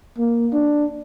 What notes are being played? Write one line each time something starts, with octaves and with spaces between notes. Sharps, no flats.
A#3
D4